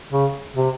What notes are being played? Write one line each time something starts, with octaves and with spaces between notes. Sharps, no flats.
C#3
C3